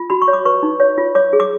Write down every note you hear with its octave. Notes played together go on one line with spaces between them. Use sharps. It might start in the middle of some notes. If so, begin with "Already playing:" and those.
Already playing: F4
F#4 B5
C#6
C#5
D6
B4 C#6
D#4
C#5
F4
C#5 D6
G#4
D6